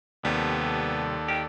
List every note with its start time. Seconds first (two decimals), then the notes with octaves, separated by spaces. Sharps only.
0.25 D#2 C3 G3 B3 A4 D5
1.28 D#3 G4